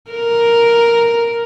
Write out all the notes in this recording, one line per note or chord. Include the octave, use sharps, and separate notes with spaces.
A#4